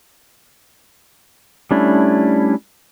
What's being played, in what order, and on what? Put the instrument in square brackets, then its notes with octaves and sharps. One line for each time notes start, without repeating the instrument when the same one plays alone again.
[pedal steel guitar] G3 A3 C#4 D4 E4